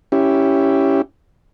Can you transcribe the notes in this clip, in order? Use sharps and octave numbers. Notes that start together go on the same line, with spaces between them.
C#4 E4 G4